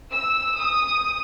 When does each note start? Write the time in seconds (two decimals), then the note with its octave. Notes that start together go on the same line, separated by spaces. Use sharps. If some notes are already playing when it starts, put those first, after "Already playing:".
0.12 E6
0.57 D#6